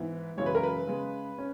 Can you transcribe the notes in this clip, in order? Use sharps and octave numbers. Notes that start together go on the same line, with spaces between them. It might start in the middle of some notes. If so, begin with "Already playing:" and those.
Already playing: G#2 E3 B3
F#2 C#3 E3 G#3 C#5
B4
A#4
B4
C#3 G#3 B3
C#4